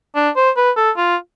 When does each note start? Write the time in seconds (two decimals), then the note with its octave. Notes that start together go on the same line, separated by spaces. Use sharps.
0.15 D4
0.36 C5
0.57 B4
0.77 A4
0.97 F4